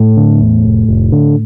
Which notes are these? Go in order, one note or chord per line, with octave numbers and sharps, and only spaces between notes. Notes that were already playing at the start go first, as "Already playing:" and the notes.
Already playing: A2 A3
D3
E2
F1
F1
D3